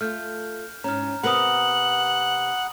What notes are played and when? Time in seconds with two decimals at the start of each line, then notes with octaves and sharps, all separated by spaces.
0.01 A3 F4 F6 G6
0.84 G#2 C#4 A#5 F6
1.23 C3 B3 A#4 F#5 B5 D#6 F#7